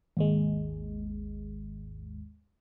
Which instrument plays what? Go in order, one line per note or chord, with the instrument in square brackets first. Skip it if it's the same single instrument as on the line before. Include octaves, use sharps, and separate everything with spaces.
[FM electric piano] G#1 D#2 G#3